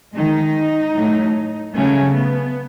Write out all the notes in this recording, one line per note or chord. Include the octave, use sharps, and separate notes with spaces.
D#3 G#3 D#4
A2 F#3 A3
C#3 F#3 A3 C#4
B3